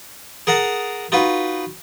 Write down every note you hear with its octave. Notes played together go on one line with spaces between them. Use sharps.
G#4 A#4 F#5 A5 A#5
D#4 F4 F#4 B4